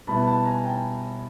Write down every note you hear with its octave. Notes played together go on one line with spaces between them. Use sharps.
B2 G3 B3 E4 A5 B5
A5 B5
G#5 A#5
G5 A5